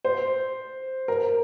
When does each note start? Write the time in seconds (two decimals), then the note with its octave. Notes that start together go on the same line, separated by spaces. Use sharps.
0.05 C5
1.08 A#4